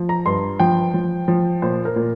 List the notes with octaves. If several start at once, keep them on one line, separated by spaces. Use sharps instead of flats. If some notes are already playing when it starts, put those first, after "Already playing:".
Already playing: F3
A#5
G2 C6
F3 G5
F3
F3
A#2 C5
A#4
A#2